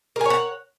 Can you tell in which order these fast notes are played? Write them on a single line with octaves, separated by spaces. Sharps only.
A#4 G#5 C#5 F#5